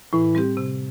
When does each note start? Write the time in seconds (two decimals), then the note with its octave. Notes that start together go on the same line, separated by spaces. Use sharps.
0.13 A2 E3
0.35 G3 C4 G4
0.57 C3